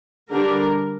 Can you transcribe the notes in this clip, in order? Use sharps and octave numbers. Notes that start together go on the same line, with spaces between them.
D3 G3 D4 A#4